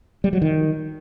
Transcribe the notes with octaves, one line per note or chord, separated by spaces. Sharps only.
G3
F#3
D#3